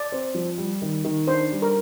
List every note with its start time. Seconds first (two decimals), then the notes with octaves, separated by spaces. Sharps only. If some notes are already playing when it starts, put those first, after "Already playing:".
Already playing: D5
0.12 C4
0.35 F3
0.58 G3
0.82 D#3
1.04 D#3
1.27 D4 C5
1.51 G3
1.62 A#4